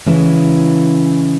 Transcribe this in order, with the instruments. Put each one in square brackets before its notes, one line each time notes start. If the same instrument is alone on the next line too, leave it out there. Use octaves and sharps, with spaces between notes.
[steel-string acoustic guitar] C#3 E3 G#3 C#4 E4